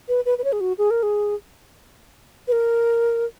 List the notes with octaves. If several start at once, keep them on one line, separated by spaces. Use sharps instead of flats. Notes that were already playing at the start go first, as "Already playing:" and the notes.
B4
B4
B4
C#5
G#4
F#4
G#4
A#4
G#4
B4
A#4